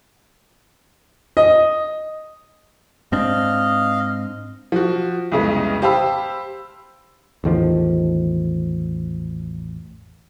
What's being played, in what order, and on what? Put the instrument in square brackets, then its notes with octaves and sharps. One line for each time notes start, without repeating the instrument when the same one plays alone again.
[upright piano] D#5
[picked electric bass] G#2 C4 D4 [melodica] D#5 F5
[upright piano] F3 F#4
C2 F2 C#3 G#3 B3
G4 C5 F5 A5 B5 E6
[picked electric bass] A1 E2 D#3 F3